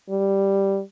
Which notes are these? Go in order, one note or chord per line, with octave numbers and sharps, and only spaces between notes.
G3